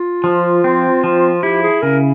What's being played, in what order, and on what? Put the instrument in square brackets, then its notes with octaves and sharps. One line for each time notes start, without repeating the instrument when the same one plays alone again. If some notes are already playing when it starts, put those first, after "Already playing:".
Already playing: [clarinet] F4
[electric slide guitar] F3
C4
F3
[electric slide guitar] E4 [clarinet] G4
[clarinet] G#4
[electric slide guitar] C#3 [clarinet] A#4